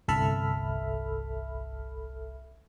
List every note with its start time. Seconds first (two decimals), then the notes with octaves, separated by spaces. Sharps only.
0.08 G1 C2 A4 E5 B5 F6